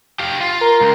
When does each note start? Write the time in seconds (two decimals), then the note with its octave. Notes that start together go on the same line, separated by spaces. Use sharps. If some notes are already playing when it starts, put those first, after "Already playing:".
0.20 G4 F5
0.41 F4
0.61 A#4
0.81 C#2